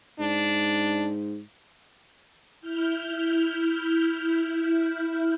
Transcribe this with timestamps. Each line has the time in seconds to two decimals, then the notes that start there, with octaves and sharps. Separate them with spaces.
0.20 G#2 D4
2.61 E4 F6 G6